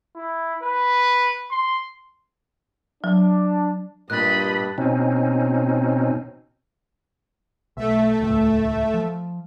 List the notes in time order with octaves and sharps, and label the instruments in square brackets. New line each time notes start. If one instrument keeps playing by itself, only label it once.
[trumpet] E4
B4
C6
[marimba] F#3 [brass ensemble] D4
[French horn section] G2 [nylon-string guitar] A#2 [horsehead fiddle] D#5 B5 [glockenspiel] F#6 A6
[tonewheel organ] B2 C4 C#4 D#4
[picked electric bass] B1 [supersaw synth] A3 E5
[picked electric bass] D#1 C#2 A2
F3